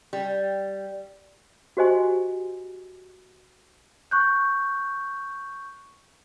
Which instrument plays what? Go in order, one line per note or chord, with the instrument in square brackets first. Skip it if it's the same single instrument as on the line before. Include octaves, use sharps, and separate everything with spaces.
[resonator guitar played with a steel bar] G3
[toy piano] F#4 G4 C5 D#5 G#5 C6
[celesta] C#6 F#6 G6